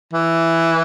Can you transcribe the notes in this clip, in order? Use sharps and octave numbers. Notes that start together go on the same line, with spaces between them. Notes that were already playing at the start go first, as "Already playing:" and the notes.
E3